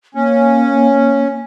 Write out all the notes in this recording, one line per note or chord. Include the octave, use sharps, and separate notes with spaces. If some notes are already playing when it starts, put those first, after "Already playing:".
A#3 C#4